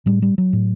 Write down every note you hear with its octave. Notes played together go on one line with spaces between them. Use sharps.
A2 G3
G3
F#3
A2